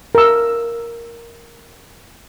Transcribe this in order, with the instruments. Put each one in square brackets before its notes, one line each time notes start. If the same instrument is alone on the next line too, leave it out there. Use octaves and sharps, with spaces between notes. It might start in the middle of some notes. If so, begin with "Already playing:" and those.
[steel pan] A#4 E6